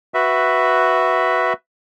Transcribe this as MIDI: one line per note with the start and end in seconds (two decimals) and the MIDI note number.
0.14 1.53 66
0.14 1.53 71
0.14 1.53 76